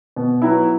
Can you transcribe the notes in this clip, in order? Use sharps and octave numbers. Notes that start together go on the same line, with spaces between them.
B2
F#3 B3 E4